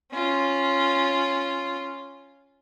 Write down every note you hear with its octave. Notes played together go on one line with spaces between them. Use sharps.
C#4 F4